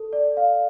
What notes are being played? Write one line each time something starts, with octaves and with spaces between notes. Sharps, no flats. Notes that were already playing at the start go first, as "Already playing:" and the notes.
Already playing: A4
D5
F5